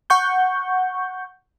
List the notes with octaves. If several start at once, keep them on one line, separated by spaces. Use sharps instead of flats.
F#5 C#6 G6